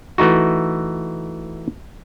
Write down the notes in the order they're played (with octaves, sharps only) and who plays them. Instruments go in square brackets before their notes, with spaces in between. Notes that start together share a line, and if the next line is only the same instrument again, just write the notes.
[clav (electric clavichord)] E3 A3 D#4 F#4